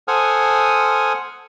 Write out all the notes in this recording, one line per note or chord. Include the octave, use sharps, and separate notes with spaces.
A4 C5 F#5 G#5 D#6 F6